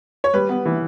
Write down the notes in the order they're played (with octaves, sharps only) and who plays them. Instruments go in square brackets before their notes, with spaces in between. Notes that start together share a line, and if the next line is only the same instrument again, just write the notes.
[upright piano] C#5
[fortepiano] G3 [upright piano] B4
[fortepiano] B3
E3